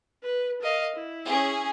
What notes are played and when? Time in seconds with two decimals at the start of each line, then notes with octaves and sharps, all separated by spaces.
0.22 B4
0.60 A#4 D#5 F5
0.94 E4
1.24 C#4 G#4